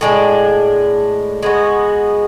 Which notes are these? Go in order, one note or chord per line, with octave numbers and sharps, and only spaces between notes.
A2 G#3 D4
G#3 B3 F#4